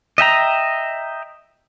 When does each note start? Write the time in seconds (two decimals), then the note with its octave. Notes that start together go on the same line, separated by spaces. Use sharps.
0.18 D#5 E5 G5 A#5